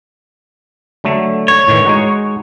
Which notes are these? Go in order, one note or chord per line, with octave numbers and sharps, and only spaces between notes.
D3 F#3 A3
C#5
A2 D#3 E3
G#3 D#4 F#4